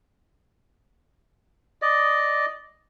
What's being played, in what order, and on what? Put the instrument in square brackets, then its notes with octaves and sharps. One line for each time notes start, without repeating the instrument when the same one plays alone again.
[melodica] D5 D#5